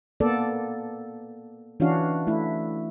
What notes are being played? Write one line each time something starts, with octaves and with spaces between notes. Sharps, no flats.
A#3 B3 A4 D5
E3 C#4 D4 F#4 F5
A3 E4